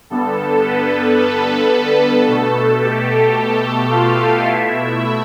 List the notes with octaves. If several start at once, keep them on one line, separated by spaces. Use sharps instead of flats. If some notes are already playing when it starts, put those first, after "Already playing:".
G2 D3 G3 B3 A4
B3 B4
A4
B2 A3
G4
A4
F4 F5
B2 A3 E4 E5